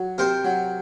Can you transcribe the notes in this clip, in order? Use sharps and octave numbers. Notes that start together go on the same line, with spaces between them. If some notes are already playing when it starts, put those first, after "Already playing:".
Already playing: F#3
C3 A#4 C5
F#3